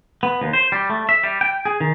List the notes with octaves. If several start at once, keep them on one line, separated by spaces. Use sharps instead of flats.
B3
D#2
C5
G3
A3
E5
G3
G5
G#4
D#3